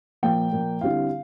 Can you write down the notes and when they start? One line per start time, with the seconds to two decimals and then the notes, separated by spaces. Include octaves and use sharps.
0.23 A#2 F3 A#3 G5
0.52 A#2 F3 A#3
0.81 D3 G3 C4 E4 F5